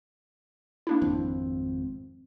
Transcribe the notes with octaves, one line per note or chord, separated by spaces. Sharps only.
A#3 D4 E4
G#1 F2 C4